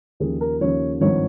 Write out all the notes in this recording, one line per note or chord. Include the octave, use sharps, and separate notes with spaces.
D#2 C#3 F3 G#4
A#4
D#2 C#3 F3 C#5
G#1 G2 F3 C#5